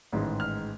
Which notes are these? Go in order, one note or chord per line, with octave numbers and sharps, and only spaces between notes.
A1 G#2 D#3 G#3
F6